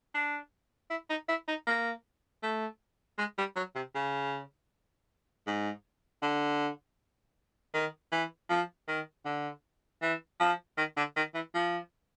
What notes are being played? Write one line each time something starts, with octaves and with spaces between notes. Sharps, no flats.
D4
E4
D#4
E4
D#4
A#3
A3
G#3
G3
F#3
C3
C#3
G#2
D3
D#3
E3
F3
D#3
D3
E3
F3
D#3
D3
D#3
E3
F3